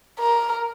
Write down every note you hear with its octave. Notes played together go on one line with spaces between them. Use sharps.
A#4